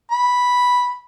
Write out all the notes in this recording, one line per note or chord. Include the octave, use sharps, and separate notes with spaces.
B5